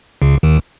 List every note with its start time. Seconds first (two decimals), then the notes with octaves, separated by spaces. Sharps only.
0.22 C#2 C#3
0.43 D#2 D#3